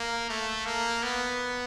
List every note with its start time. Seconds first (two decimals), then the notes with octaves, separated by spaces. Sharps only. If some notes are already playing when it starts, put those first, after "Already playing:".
Already playing: A#3
0.30 A3
0.66 A#3
1.03 B3